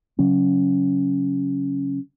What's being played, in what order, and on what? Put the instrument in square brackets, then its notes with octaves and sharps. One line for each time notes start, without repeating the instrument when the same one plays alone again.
[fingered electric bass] C#3 F#3 C#4